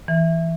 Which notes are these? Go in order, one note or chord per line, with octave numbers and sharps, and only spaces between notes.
E3